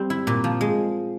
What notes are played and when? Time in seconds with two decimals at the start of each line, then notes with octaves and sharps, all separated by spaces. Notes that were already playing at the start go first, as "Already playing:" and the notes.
Already playing: G3 C4
0.10 E4
0.27 A#2
0.44 F3
0.61 G#3